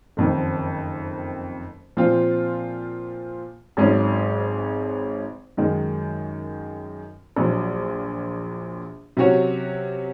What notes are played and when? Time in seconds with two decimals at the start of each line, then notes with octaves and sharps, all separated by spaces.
0.17 F#1 F2 D#3
1.97 A#2 F3 C4 F4
3.77 G#1 G#2 F#3 C#4 G#4
5.57 F#2 D#3 G#3
7.36 A#1 A#2 F#3
9.17 C3 F#3 C#4 F#4 C#5